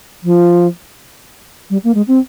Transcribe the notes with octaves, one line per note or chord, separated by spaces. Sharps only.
F3
G3
A#3
G#3
C4